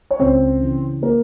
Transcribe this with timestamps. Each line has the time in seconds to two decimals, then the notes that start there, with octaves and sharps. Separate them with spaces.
0.11 C#5
0.20 C#2 C4 C5
0.61 C#3 E3
1.02 A#3 A#4